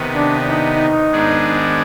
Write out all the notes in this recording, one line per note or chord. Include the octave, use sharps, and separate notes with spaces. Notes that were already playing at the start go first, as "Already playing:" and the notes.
Already playing: C3 D#3 B3
D4
D#4
G#2 D#3 B3 D4 G#4